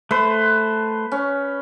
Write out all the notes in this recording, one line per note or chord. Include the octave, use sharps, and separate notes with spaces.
A3 B4 C5
C#4